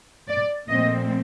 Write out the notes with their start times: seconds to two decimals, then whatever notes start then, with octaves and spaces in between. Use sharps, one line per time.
0.28 D5
0.69 A#2 F3 A3 C4 D#5